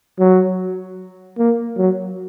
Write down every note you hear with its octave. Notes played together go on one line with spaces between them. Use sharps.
F#3
A#3
F#3